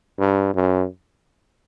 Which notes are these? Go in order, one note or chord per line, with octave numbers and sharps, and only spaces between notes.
G2
F#2